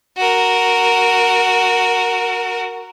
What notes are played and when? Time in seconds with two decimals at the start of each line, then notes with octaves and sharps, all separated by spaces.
0.17 F#4 A#4